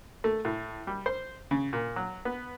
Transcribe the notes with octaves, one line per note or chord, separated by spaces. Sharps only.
A3
A2
G3
C5
C#3
A#2
F#3
B3